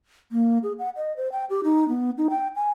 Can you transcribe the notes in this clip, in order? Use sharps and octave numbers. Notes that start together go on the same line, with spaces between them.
A#3
G#4
F#5
D#5
C5
G5
G4
D#4
B3
D#4
G5
G#5